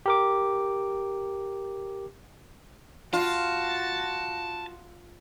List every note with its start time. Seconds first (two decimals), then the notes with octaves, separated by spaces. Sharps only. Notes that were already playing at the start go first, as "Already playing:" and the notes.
0.06 G4 A#4 D6
3.13 F4 F#4 A5